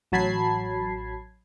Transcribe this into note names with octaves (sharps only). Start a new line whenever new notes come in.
A1 F#3 A5 B5 G#6 C7